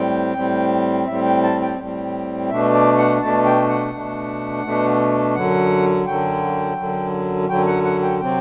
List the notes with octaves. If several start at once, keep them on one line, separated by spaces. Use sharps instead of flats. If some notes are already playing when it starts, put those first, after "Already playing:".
Already playing: A2 G3 C4 G5
A2 G3 C4
A2 G3 C4 E5
G5
A5
G5
A2 G3 C4
B2 A3 D4 E5
D5
F#5
B2 A3 D4 A5
G5
F#5
B2 A3 D4
B2 A3 D4
F#2 D3 F#3 F#5
F#2 D3 F#3 G5
F#2 D3 F#3
F#2 D3 F#3 G5
F#5
F#5
G5
C3 F#3 C4 G5